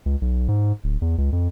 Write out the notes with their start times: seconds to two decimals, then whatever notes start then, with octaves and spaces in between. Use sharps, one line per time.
0.06 C#2
0.21 B1
0.48 G#2
0.84 D1
1.01 E2
1.18 C#2
1.32 F2